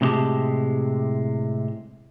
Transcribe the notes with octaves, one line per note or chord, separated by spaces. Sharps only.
A2 C3 F3 G#3 G4 A5